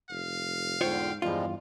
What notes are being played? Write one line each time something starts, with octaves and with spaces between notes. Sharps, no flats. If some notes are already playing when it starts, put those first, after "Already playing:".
F1 F5
E2 G#2 D3 F4 C5 C#5 G5
E2 G2 F3 G3 G#3 F4